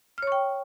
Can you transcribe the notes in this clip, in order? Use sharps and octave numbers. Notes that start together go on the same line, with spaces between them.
C#5 G5 C#6 F6